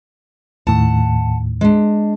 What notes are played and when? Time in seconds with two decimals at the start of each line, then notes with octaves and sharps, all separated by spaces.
0.67 D#2 A2 D#3 F#5 A5
1.61 G#3 D4